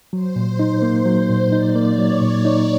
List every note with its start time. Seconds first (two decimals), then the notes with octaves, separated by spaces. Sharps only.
0.13 F#3 C5
0.36 A#2
0.48 C5
0.59 D#4
0.82 A#3 C5
1.06 F#3
1.29 A#2
1.52 D#4 D5
1.75 A#3
1.87 C#5
1.98 F#3
2.22 A#2
2.45 D#4